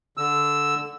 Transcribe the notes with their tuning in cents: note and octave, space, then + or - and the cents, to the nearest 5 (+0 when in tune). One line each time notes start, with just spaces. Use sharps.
D3 -10 E6 +0